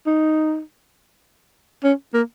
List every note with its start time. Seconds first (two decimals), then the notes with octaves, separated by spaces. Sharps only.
0.07 D#4
1.84 C#4
2.14 A#3